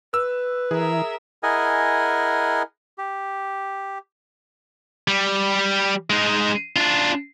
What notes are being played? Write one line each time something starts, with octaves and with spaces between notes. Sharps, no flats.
B4 E6
E3 G#4 A#4 E5
E4 G#4 A#4 D#5 F#5 G#5
G4
G3
G#3 D#4
D4 F4